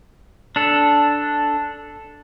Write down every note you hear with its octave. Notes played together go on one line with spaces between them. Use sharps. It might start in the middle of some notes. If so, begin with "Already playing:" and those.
D4 A4